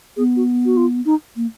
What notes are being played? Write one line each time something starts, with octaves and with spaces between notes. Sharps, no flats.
B3 G#4
F#4
F#4
F4
D#4
A#3